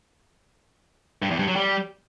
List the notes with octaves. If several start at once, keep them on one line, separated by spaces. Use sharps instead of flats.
G2
E2
G2
F#3
G3